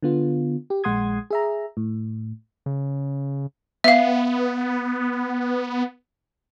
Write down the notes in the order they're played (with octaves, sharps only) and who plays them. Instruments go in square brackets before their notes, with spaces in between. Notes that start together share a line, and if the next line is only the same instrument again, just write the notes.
[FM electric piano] D3 B3 F4
G4
A#1 G#3 F#5 C6 D#6 G#6
G#4 E5 A#5
A2
[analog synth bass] C#3
[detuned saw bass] B3 [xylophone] E5 F5